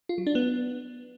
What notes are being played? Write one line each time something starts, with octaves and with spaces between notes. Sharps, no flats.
F4
F#3
D4
B3